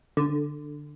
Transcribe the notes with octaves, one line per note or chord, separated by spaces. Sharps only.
D3